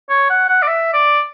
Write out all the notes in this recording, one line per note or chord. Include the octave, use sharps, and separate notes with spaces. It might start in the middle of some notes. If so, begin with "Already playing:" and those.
C#5
F#5
F#5
D5
E5
D5